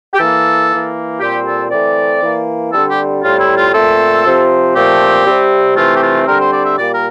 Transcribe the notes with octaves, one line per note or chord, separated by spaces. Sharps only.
G4
E3 A#3 A4
E3 A#3
A#2 G3 C4 G4
A4
E3 A3 C4 D5
E3 A#3
D3 G3 C4 A4
G4
A2 G3 C4 F4
E4
F4
A#2 A3 C4 A4
C3 F3 C4
A#2 F3 A3 C4 G4
C3 G3 C4
C3 E3 A3 C4 F4
G4
F4
D3 G3 C4 A#4
C5
D5
E5
A#2 G3 A#3 D5
A#4